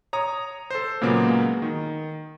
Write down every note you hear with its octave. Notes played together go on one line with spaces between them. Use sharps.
C#5 A#5 D#6
A4 C5
A#2 C#3 F#3 G#3 A#3 B3
D#3